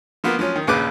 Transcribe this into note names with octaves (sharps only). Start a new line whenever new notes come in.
F3 A#3 B3
F3 F#3 C#4
D#3
A#1 D#2 C#3 B4 D6 F#6